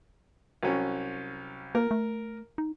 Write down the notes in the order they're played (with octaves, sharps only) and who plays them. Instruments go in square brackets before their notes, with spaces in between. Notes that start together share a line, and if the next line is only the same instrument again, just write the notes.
[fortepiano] C2 F#3 C#4
[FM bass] A#3 [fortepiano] A#4
[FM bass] A3
D#4